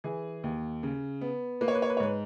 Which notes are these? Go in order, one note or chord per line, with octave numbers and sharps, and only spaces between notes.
E3 G#4
D#2
C#3
B3
A#3 B4
C#5
B4
C#5
B4
C#5
G#2 B4